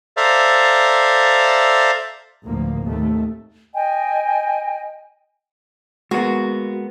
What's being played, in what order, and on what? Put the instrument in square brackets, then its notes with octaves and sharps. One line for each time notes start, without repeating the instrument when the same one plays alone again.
[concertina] A4 C5 D5 E5 F5 A#5
[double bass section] A1 D2 F3 A#3
D#2 C3 A3
[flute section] D#5 G5 G#5
[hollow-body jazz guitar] G#3 A#3 B3 [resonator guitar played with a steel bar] F#4